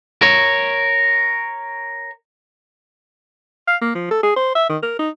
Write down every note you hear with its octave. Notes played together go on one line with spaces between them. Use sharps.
A#4 C#5
F5
A#3
F3
A4
G#4
C5
E5
D#3
A#4
D#4